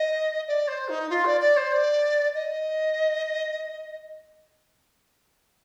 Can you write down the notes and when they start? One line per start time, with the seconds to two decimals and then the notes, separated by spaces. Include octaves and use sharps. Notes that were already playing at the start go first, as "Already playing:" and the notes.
Already playing: D#5
0.48 D5
0.68 C5
0.89 D#4
1.10 F4
1.25 D5
1.41 D5
1.57 C5
1.72 D5
2.35 D#5